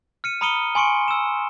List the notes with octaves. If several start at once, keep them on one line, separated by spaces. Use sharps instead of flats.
F6 C#7 D#7
A#5 B5 D#6 C#7 D#7 G7
G#5 C6 C#6 C#7 D7
E6 E7